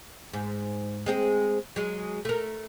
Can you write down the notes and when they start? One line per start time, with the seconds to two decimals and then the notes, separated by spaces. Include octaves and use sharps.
0.33 G#2
1.06 G#3 C4 G#4
1.76 F#3 G#3
2.25 A3 A#4